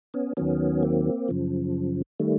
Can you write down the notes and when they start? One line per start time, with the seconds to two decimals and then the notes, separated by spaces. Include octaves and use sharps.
0.14 B3 C#4
0.37 D#2 D#3 F#3 B3 C#4
0.83 A#3 C4
1.28 F#2 C#3 F3
2.20 D#3 G3 A3